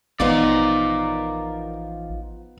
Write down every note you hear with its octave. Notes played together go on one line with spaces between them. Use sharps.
A1 F3 B3 D#4 F4 A#4 D5